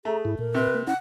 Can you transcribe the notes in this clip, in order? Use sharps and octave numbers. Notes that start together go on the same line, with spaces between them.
A3 G#4 A#5
G#2 E4
A#2 A#4
C3 B4
A#3
C#4 E4 F#5